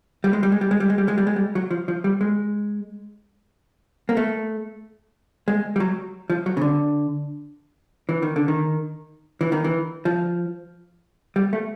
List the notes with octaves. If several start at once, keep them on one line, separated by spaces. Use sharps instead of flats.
G3
G#3
G3
G#3
G3
G#3
G3
G#3
G3
G#3
G3
G#3
G3
F#3
F3
F3
G3
G#3
A#3
A3
G#3
G3
F#3
F3
F#3
C#3
D3
E3
D#3
D3
D#3
E3
D#3
E3
F3
G3
A3